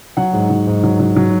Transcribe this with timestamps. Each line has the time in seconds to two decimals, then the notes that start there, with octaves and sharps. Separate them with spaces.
0.17 F#3 F#5
0.33 G#2
0.50 F#3
0.67 G#2
0.83 F#3
1.00 F#3
1.16 F#3